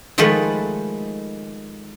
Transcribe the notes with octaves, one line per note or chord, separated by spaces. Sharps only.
D#3 F3 G#3 A3 B4